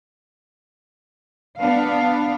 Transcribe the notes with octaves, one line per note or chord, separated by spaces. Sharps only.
B3 D4 F5